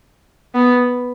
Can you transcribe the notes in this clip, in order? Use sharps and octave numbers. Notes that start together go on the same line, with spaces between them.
B3